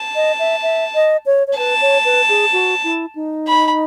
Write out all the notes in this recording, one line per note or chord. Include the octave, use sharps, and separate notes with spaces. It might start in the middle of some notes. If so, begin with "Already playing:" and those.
Already playing: A5
D#5
E5
E5
D#5
C#5
C#5
B4 A5
C#5
B4
G#4
F#4
E4
D#4
B5